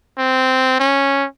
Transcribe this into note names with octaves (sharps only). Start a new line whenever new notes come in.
C4
C#4